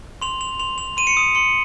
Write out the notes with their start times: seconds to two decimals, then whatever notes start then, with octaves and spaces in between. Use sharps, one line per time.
0.22 C6 F7
0.40 C6 F7
0.59 C6 F7
0.78 C6 F7
0.97 C6 D#7
1.07 C#7
1.17 D#6 D#7
1.35 C6 C#7